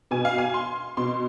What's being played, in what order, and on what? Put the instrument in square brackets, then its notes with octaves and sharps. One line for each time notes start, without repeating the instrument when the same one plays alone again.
[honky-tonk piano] B2 G#5
F5
G#5
C6
B2 C6